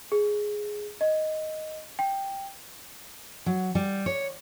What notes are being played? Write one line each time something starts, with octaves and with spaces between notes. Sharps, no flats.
G#4
D#5
G5
F#3
G3
C#5